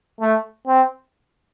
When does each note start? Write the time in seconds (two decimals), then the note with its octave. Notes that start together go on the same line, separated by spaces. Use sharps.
0.21 A3
0.67 C4